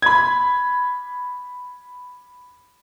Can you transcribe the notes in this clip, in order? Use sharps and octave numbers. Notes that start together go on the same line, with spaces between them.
B5 G#6